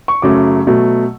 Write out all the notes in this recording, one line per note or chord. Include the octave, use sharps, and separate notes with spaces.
C#6
F#2 C#3 F#3 A3 D6
B2 F#3 A3